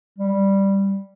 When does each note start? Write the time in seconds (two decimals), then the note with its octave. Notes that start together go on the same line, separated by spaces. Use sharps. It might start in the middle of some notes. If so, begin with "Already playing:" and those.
0.18 G3